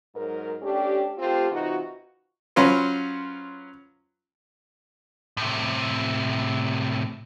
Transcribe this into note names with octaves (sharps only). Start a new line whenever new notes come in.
G#2 F#3 A#4
A3 C#4 D4 G4
A3 C4 F4 G4
C3 E3 D#4 F4 F#4
F#3 C#4 F4 B4 C5
A2 C3